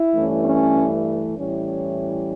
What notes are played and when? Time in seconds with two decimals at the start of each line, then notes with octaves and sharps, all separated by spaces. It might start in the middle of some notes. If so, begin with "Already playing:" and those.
Already playing: E4
0.15 G2 E3 A3 C#4
0.44 C#4
1.35 A2 E3 G3 C#4